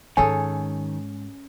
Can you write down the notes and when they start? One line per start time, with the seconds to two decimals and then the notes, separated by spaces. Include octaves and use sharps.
0.17 G#2 D#3 G#3 C#4 G#4 A4 G#5